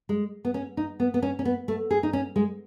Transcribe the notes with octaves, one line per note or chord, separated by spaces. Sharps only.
G#3
B3
C#4
D#4
B3
B3
C#4
C#4
B3
A3
G#4
D#4
C#4
G#3